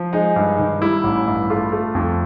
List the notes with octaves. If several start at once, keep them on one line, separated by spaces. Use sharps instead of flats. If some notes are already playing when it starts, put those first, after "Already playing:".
Already playing: F3
G#3 D#4
G2
D#3
G3 E4
A1
G2
A3 F4
A3
F2